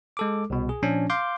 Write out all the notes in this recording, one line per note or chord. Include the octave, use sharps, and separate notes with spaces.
G#3 A4 D6
C2 B2
G#4
A#2 F3 C#4 D4
F5 C6 D6 G6